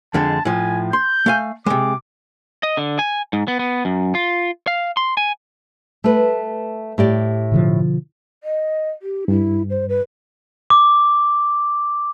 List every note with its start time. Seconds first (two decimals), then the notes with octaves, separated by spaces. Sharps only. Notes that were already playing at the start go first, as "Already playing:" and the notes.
0.14 F2 D3 G#3 A5
0.45 A2 F3 G#5
0.93 C6 G6
1.26 A3 F5 G#5
1.66 C3 G#3 D6
2.63 D#5
2.77 D3
2.99 G#5
3.33 G#2
3.48 B3
3.59 B3
3.85 F#2
4.15 F4
4.67 F5
4.97 C6
5.17 G#5
6.04 A3 B4
6.98 A2 G4 D5
7.52 B2 D3 F3
8.44 D#5
9.02 G4
9.28 G2 E4
9.70 C5
9.89 B4
10.70 D6